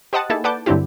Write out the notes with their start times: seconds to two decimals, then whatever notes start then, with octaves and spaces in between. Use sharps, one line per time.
0.13 G4 C5 D#5 F#5 A5 D#6
0.30 A#3 D#4 E4 G#4 A4 A5
0.44 B4 D5 F#5 A5 D6 G6
0.66 G2 D3 F#3 C4 E4 G4